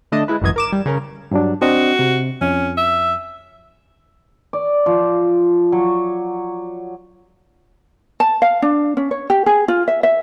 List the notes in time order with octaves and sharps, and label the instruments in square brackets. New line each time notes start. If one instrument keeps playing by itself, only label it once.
[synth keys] D3 A3 D4 D#5 A5
G#3 E4 B4
G1 C#2 F#2 E3 D#5 G#6
A#4 D6 E7
G3
C#3 C#4 A#4
[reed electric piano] G2 F#3 D4
[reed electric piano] C4 D4 D#5 [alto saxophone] F#4
[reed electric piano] C3
[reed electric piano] F2 [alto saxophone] C#4
[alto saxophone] E5
[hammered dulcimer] D5
F3
F#3
[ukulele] A5
F5
D4
C#4
C#5
G4
G#4
F4
E5
E5